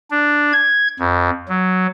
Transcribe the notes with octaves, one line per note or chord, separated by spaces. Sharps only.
D4
G#6
F2
F#3